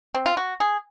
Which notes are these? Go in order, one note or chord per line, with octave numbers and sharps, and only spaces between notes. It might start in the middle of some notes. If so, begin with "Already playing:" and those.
C4
F4
F#4
G#4